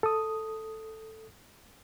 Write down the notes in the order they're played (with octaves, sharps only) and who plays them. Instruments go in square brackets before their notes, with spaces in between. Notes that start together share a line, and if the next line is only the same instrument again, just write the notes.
[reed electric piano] A4 D#6